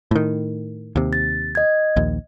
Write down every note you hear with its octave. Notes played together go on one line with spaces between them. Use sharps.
A2 D#3
D#2 C3
A6
D#5 G#6
A#1 D#2